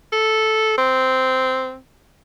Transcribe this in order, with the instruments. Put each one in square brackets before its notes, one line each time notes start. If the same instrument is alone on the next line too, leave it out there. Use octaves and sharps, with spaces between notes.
[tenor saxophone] A4
C4